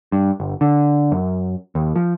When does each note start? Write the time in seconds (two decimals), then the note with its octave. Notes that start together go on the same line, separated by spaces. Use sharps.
0.12 G2
0.40 G1
0.61 D3
1.12 F#2
1.75 D#2
1.96 F3